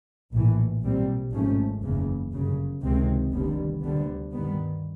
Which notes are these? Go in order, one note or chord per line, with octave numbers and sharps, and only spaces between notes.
A#1 A2 E3
B1 A#2 G3 C4
G#1 G#2 F3 A3 C#4
F#1 E2 C#3
G1 F#2 C#3
C#2 C3 D#3 G#3 C4
F1 D#2 D3 G3 B3
D2 D3 G3 B3
G2 D#3 G3 B3